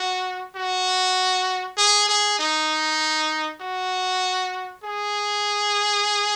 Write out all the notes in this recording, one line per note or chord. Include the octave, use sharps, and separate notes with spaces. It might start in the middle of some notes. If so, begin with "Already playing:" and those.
Already playing: F#4
F#4
G#4
G#4
D#4
F#4
G#4